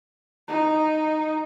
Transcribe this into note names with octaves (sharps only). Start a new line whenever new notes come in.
D#4